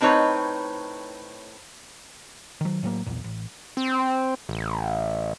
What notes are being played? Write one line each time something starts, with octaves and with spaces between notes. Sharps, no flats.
A2 C4 D#4 B4 C#5
D#3 F#3
A2 F#3 A3 A#3
B1 E2 A#2
A1
C4
A1